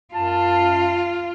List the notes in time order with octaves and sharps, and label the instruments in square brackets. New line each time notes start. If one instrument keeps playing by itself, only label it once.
[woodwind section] F#2 A5 [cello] F4